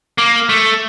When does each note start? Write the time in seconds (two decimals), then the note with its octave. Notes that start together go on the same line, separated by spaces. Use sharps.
0.18 A#3
0.49 A3